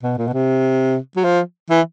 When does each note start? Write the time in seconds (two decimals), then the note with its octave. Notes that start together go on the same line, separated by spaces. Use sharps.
0.03 B2
0.18 A#2
0.28 B2
0.33 C3
1.17 F#3
1.24 F3
1.70 E3